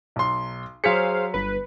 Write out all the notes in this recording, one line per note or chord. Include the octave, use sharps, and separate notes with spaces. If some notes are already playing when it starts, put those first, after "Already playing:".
B1 C6
F#3 G#4 C5 F5 B6 C#7
G1 B4